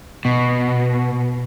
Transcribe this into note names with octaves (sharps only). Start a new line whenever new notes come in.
B2